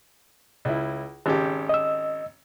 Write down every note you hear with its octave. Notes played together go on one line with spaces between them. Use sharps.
C#2 E4
G#1 C#3 G4
D#5 E6